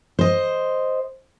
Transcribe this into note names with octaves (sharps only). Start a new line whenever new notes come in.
C5 D#5